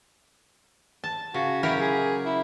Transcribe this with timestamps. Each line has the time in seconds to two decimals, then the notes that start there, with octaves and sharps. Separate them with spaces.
1.04 A5
1.34 C#3 F#4
1.63 F#3 E4 G4 A#4
1.80 G#4
2.25 E4